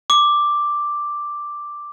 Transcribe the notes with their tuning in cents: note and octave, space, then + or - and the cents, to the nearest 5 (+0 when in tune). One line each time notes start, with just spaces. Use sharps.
D6 +0